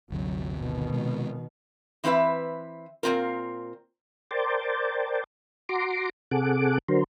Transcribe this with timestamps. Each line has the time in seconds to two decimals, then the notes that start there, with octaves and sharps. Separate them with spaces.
0.10 G1 D2 C3 F#3
0.58 B2 D#3
0.92 C3 G#3
2.04 E3 C4 E4 B4 E5
3.03 A#2 E3 C4 F4 A#4
4.31 A#4 C5 D5 G5 A5
5.69 F#4 A#5 C6 D6
6.31 C3 G#4 A4 F#5 D6
6.89 D3 F#3 A#4 C5